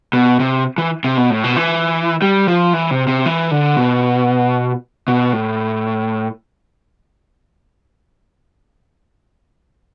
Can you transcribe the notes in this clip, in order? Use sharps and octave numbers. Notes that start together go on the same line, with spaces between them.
B2
C3
E3
C3
B2
A2
B2
E3
G3
F3
E3
C3
C3
E3
D3
B2
B2
A2